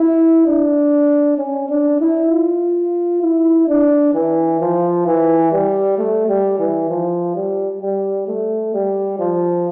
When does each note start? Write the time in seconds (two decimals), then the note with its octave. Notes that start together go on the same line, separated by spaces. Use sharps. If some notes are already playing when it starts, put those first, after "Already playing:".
Already playing: E4
0.46 D4
1.38 C#4
1.69 D4
2.00 E4
2.31 F4
3.23 E4
3.68 D4
4.14 E3
4.60 F3
5.06 E3
5.52 G3
5.98 A3
6.28 G3
6.59 E3
6.89 F3
7.35 G3
7.81 G3
8.28 A3
8.74 G3
9.19 F3